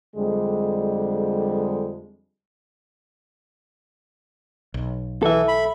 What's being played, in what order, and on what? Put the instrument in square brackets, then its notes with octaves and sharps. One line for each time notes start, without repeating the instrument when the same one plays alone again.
[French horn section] F2 D3 G3 G#3
[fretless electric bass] B1
[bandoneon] E3 [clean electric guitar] A4 E5
[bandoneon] B5